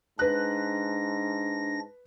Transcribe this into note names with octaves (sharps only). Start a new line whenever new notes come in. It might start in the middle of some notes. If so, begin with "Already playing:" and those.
G#2 D4 B4 F#6 A#6